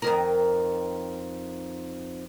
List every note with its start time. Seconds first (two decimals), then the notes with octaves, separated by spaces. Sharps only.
0.02 F2 D#3 A#4